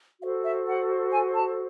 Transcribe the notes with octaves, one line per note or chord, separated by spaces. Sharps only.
F#4 A4 C5 F5
E5
F#5
G#5
A5